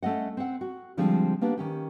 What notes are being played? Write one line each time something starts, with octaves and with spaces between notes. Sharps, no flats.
A3 C#4 D#5 F#5
C4 F#5
F#4
D3 F3 G3 G#3 C4 D4
A#3 B3 D4 G4
D#3 C#4 G4